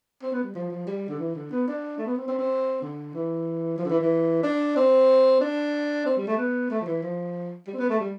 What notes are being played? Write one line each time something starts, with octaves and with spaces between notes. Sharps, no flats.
C4
B3
G3
F3
F3
G3
D3
E3
D3
B3
D4
A3
B3
C4
C4
C4
D3
E3
F3
D3
E3
E3
D4
C4
D4
C4
G3
A3
B3
A3
F3
E3
F3
G3
C4
B3
A3
G3